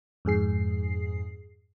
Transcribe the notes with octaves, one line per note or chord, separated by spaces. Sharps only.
F2 G#2 G#4 C7